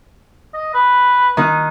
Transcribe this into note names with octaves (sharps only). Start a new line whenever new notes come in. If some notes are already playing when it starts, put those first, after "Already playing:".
D#5
B4
D#3 D#4 F#6